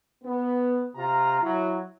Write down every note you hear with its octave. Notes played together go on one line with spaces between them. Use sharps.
B3
C3 F4 A#5
F#3 E4